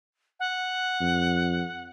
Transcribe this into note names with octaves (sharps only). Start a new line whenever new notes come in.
F#5
F2